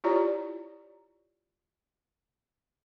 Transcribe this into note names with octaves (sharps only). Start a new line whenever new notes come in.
E4 F4 G4 C#5 D5 A#5